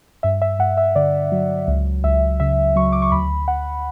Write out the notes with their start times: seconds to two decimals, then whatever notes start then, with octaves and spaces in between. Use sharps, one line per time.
0.23 G2 E5
0.42 E5
0.59 G2 F#5
0.77 E5
0.96 D3 D5
1.32 F#3
1.68 C#2
2.04 C#2 E5
2.40 C#3 E5
2.76 F#3 C#6
2.93 D6
3.02 C#6
3.12 D2 B5
3.48 D2 F#5